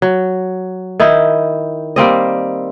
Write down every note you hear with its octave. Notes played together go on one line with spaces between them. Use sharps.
F#3
D#3 D#4 E4
G3 A#3 C4 D#5